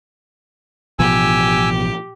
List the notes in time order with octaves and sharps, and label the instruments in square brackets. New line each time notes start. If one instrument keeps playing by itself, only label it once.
[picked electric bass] A1 B2 F3 [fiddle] G4 [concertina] G#5 E6